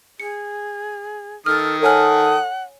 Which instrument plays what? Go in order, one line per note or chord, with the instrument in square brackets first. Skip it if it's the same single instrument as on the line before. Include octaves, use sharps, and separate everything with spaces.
[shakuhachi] G#4 [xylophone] C#7
[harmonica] D#3 D#6 [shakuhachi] A4 [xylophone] F6
[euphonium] A4 [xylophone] C#5 G#5 F6 [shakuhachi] F#5